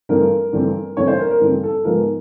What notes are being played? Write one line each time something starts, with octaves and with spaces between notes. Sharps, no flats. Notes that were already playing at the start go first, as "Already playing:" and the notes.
G2 E3 A3 C4 A#4
G2 E3 A3 C4
G2 E3 A3 C4 C#5
C5
A#4
A#4
G2 E3 A3 C4
A4
G#2 F3 G#3 B3 A#4